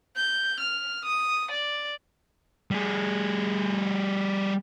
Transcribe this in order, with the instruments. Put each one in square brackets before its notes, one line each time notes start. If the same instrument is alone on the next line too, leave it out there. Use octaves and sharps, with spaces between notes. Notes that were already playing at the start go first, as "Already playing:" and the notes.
[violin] G6
F6
D#6
D5
[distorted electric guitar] G3 G#4